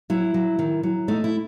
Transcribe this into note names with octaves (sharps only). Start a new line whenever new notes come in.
F#3 E4
F#3
D#3
F#3
A3 D#4
E4